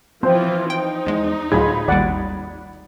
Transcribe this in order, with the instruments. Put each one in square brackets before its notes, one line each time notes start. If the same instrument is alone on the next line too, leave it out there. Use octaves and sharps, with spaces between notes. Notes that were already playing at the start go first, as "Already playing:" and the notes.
[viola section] E3 F3 F4 [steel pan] C4 [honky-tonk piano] C5
[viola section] D#4 [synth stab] G5
[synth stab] E2 G#3
[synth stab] D2 A2 F#3 [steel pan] F4 G#4 [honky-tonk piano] B5 G#6
[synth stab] G#1 D#2 G3 [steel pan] D5 F#5